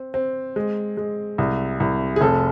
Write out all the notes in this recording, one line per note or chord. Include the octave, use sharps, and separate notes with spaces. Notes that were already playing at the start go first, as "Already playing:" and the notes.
Already playing: C4
C4
G#3
G#3
C2
C2
G#4
F1 A4